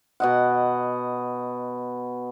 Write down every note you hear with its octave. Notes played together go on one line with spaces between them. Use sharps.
B2 D#5 F#5